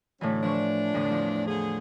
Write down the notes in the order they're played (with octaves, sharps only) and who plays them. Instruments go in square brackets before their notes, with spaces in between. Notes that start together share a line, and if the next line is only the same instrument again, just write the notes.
[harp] A2 D3 E3 [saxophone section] F#3 C#4 D4
[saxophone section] E3 D4 [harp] F3 C#6
[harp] E2 A2 D3
E2 F3
[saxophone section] D3 G#4